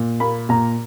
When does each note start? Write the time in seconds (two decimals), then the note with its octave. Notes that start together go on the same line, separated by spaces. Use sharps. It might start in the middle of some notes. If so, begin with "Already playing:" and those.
Already playing: A#2
0.20 A#3 B5
0.49 A#2 A#5